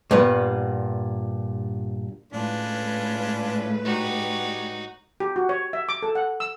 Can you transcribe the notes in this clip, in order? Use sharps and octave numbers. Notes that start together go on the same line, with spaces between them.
G2 A#2 B3 B4
A2 G#3 C#4 D4 F4 B4
D#4 F#4 G4 C#5 D5
G4
F#4
C#5
E5
D6
A4
F#5
E6